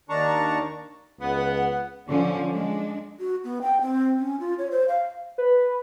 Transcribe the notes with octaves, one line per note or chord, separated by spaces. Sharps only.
D#2 D#3 D4 A5 A#5 C#6
C#2 B3 F#5
D3 F3 C#4
G#3 D4
F#4
B3
G5
C4
C#4
F4
C#5
C5
F5
B4